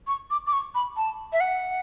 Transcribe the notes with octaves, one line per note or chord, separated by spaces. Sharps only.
C#6
D6
D6
C#6
B5
A5
E5
F#5